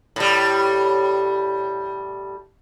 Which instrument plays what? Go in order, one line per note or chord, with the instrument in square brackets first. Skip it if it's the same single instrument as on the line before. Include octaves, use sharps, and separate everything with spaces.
[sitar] A2 G3